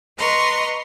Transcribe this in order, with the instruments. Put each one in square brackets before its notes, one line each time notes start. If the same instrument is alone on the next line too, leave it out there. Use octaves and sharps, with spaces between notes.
[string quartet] B4 D#5 A#5 C6 C#6